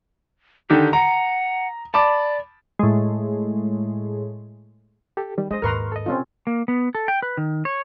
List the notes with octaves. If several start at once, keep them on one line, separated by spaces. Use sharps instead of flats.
D3 D#3 D#4 G4
F#5 A#5
D5 A5 B5 D6
A2 G#3
G4 A4
D#3 G3
G3 G#3 D4 C5 D#5
D#2 G#2 A#4 B4 A#5 C6 C#6 F6
A4 D#5
C3 C4 C#4 F4
A#3
B3
A4
G5
B4
D#3
C#5